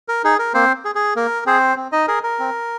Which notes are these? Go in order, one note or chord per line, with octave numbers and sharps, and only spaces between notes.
A#4
D#4 G#4
A#4
A#3 C4 C5
G#4
G#4
A#3 A#4
C4 G#4 C5
C4
D#4 D#5
G#4 A#4
A#4
C4